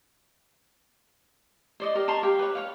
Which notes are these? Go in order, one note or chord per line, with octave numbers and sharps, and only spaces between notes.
C5 D5 D#5
G4 A#4
A5 A#5 C6 C#6
G4 F5 G5
B4 C#5
C#5 F5